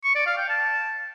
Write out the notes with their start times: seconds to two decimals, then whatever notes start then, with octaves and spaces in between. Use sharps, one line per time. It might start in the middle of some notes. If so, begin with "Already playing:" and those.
0.04 C#6
0.16 D5
0.27 F5
0.38 G5
0.49 A5